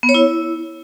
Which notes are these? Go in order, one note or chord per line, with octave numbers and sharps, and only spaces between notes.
B3
C#5
E4